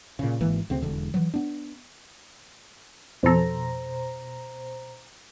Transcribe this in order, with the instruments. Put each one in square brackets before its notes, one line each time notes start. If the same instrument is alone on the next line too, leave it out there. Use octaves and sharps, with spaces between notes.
[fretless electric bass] A#2 C#3
G#1 E3 A#3
D2 C#3 C4
E1 D3
E3 F#3
B3 D4
[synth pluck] F2 A4 [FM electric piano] B2 C5 A#5